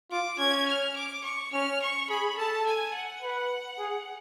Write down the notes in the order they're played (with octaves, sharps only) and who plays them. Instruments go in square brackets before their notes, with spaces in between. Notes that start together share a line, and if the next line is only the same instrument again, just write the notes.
[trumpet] F4 [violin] D6
[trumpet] C#4 [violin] G#6
[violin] F6
D6
C#6
[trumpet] C#4 [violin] F6
[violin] C#6
[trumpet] G#4 [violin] B5
[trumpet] A4 [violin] A5
[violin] G#5
F#5
[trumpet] B4
G#4